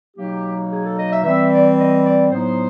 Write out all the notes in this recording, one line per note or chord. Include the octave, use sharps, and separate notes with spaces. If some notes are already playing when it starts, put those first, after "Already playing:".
B2 F#3 A#3 D#4 G4
G#4
A4
D#5
E5
E3 G3 C4 E5
D5
D#5
D5
A2 F#3 B3 D#4 C5